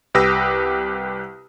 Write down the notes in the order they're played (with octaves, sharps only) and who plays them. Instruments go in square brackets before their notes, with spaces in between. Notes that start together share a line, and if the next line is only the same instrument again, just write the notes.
[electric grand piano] C2 G4 B4 D#6 E6 A#6